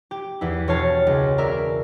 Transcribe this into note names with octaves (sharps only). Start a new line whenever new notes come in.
G4
E2 E4
E1 C#5 F5 A5
C#2
A#4 D5 E5